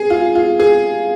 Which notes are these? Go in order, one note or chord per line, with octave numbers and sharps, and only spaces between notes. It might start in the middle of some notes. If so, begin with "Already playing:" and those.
Already playing: G#4
F4
F4
G#4